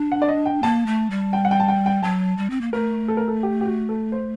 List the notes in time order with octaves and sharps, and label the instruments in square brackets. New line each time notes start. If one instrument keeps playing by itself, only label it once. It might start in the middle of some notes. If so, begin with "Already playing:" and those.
Already playing: [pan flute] D4
[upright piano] F#5
D5
D#5
G5
[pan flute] A#3 [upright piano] A5
[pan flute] A3
G3
[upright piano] G5
F#5
G5
A5
G5
G5
[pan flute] F#3 [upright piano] A5
[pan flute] G3
C4
A#3
[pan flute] A3 [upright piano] A#4
[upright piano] A4
A#4
A4
G4
G4
F#4
A4
C5